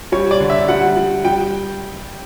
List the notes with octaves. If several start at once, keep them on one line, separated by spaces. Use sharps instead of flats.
G3 C#5
D5
D3
E5
G3 F#5
G3
G3 G5